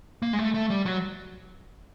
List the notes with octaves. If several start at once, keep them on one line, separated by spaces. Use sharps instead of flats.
A#3
G#3
A3
A3
G3
F#3